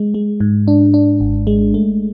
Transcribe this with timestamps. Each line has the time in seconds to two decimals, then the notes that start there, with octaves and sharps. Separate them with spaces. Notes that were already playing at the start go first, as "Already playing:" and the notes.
Already playing: G#3
0.14 G#3
0.40 G#2
0.68 D4
0.94 D4
1.20 G#1
1.47 G#3
1.74 A3